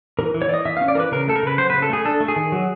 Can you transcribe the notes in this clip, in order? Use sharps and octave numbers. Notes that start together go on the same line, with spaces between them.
E3 A#4
E3
C#5
E3 D5 D#5
E3 E5
F5
C#4
D5
E3 A#4 B4
C#3 A#4
A3 A4
A#4
C#3 B4
F#3 C5
B4
C#3
A4
A3 G#4
D4 A4
A3
G#4
D#3
F#3